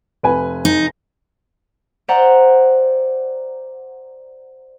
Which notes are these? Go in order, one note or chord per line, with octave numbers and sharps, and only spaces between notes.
F1 B4 G#5
D#4
C5 D5 E5 F#5 G5 A#5